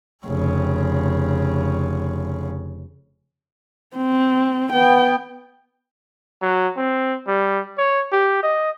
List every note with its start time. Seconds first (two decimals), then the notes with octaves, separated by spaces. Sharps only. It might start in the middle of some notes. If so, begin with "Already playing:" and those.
0.25 F1 C#3
3.95 C4
4.73 B3 G5
6.42 F#3
6.77 C4
7.27 G3
7.78 C#5
8.12 G4
8.43 D#5